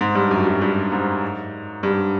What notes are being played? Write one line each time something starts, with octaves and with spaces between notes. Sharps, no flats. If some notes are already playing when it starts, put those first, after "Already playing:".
G#2
G2
F#2
F#2
G2
G#2
G2